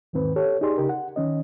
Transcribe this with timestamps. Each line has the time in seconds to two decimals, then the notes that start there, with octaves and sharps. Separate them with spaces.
0.13 E2 G#2 D#3 C4 B4
0.36 G4 A4 C#5
0.61 D#4 G4 G#4 D5 C6
0.78 C#3 D#4 G4 A#4
0.89 F#5
1.16 D#3 C#4 D#5